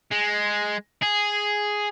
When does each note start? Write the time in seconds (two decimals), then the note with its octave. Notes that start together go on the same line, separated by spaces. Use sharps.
0.11 G#3
1.02 G#4